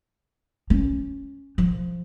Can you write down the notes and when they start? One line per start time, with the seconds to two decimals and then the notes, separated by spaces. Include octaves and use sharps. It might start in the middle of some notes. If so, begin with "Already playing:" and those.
0.70 C#4
1.58 F3